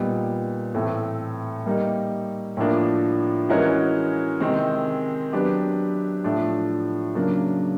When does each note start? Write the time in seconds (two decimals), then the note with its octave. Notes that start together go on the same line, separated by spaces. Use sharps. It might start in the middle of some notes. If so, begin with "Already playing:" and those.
Already playing: A#2 G3 B3 D#4
0.74 A2 E3 A3 C4
1.66 G3 A#3 D#4
2.57 A2 F3 A#3 D4
3.49 E3 G#3 C#4 F#4 A#4
4.40 C3 D#3 G#3 C4
5.33 F#3 B3 D4 G4 B4
6.24 A2 F3 A3 D4
7.15 C#3 F#3 A#3 D4